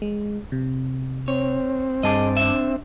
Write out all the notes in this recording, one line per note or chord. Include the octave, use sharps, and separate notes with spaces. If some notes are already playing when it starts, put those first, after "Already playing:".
G#3
C3
C4 C#5
G2 G#4 D#5 A5 D6
D4 E5